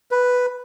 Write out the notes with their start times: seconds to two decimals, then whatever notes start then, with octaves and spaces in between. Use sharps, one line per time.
0.11 B4